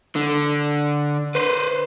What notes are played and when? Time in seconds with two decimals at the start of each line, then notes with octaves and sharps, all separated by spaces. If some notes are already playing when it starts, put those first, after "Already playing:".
0.16 D3
1.35 B4 C5